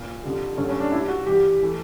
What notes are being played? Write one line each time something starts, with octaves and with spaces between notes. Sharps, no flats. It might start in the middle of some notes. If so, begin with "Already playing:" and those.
Already playing: A#2
F2 D3 G3
G2 D3 F#3 A3 C#4
C#4
D4
A#2 G3 E4
F#4
G2 E3 G3 G4
E3 A3